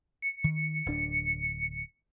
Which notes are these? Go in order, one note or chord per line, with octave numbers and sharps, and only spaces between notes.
C#7
D#3
D1 D4